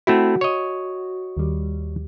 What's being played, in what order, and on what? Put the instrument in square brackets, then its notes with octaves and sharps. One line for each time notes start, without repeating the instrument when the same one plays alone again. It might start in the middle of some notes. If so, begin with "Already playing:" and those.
[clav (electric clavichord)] A3 C4 E4 [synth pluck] F#4
[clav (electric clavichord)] C#5 D#5
[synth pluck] D#2 G3